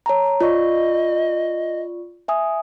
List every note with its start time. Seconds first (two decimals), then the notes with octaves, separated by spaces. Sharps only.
0.06 C#5 A5 A#5
0.41 F4 D5 D#5 C#6
2.28 E5 G#5 D#6